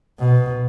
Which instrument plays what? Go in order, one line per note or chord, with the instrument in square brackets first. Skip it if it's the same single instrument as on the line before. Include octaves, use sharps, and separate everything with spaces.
[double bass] B2